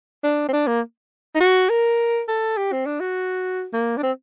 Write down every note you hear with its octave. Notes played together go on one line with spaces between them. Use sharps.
D4
C4
D4
A#3
D#4
F#4
A#4
A4
G4
C4
D4
F#4
A#3
D4
C4